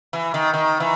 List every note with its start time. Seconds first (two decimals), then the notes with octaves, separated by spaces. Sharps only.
0.13 E3
0.34 D#3
0.54 D#3
0.80 E3